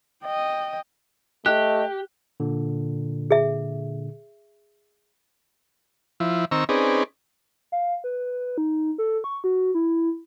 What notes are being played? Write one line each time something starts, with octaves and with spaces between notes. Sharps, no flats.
D#5 G5
A3 G4 D#5 F#6
A#2 D3
G#4 E5
F3 E4
D#3 C4 A#5 C#6 E6
C4 C#4 D#4 G#4 B4 D5
F5
B4
D#4
A4
C#6
F#4
E4